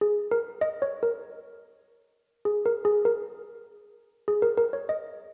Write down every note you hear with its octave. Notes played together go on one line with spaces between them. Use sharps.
G#4
A#4
D#5
C#5
A#4
G#4
A#4
G#4
A#4
G#4
A#4
A#4
C#5
D#5